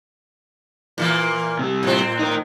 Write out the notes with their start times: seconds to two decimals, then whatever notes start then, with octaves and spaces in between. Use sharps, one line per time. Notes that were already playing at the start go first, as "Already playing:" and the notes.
0.98 A#2 E3 A#3
1.59 C3 G3
1.83 A2 C4
2.19 D#4 A#4